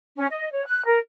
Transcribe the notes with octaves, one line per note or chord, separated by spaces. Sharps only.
C#4
D#5
C#5
F#6
A#4